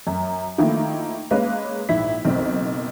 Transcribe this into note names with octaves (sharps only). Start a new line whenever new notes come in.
F#2
D#3 F3 A3 A#3 E4
G#3 A#3 C#4 B4 D#5 F5
A#1 G#2 E4 B6
F#1 B1 C4